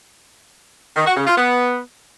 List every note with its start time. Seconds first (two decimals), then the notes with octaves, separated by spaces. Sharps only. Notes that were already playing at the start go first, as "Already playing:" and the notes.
0.96 D#3
1.06 F#4
1.17 C#3
1.27 F4
1.37 B3